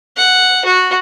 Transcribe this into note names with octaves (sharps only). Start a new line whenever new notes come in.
F#5
F#4